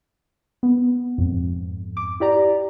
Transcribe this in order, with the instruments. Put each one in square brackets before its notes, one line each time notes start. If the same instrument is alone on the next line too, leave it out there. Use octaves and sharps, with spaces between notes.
[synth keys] B3
F2 G#2
D6
E4 G4 D5 A#5